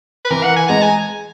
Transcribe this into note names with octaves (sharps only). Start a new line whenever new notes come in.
B4
E3 A#4
F#5
G#5
G#3 A#5
G#5